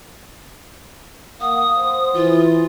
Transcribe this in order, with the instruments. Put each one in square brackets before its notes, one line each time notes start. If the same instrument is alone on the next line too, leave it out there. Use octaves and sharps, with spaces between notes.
[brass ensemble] A#3 F5 F#5 [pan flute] D#6
[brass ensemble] C5
[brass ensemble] E3 [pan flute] F4